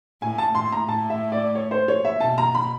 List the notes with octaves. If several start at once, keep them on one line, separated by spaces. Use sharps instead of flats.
A2 G#5
A5
A2 C6
A#5
A2 A5
E5
D5
C#5
C5
C#5
E5
B2 A5
A#5
B5